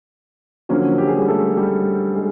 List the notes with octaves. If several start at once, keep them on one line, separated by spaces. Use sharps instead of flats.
D3 F3 F#3 A#3 C#4 F#4
G4
G#4
G3 G4
A3 A4
G3 G4
G#3 G#4